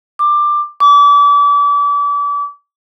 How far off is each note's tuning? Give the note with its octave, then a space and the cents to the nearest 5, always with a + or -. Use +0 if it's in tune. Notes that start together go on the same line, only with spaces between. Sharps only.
D6 +15
D6 -35